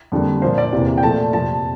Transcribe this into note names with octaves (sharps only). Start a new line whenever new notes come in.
F2 D3 G3 A#3
A#2 F3 A#3 C5
D5
E2 C3 E3 A#3
G5
A#2 F3 A3 A5
F2 C3 F3 A#3 A5